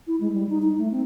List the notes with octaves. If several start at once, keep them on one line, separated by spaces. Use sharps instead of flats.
E4
G#3
G3
D#4
D#4
A3
C4